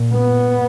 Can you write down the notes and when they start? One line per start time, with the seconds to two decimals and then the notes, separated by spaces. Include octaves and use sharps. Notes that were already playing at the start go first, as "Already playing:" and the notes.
Already playing: A#2
0.12 B3